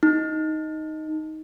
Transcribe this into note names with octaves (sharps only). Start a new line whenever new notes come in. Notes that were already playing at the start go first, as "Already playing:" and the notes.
D#4